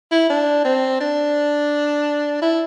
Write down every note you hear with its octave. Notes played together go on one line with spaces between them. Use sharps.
E4
D4
C4
D4
E4